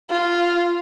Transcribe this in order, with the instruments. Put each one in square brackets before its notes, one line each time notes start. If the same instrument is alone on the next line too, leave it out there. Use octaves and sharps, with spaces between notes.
[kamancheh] F4